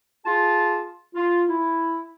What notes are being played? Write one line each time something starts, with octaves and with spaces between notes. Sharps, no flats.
F4 G#4 A5
F4
E4